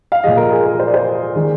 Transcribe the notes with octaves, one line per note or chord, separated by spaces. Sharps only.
F5
A#2 F3 G#3 D#5
A#4
G#4
A#4
C5
D5
C5
D#3 G#3